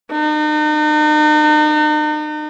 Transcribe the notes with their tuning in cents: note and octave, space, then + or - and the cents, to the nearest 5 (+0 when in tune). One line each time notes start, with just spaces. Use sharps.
D#4 -40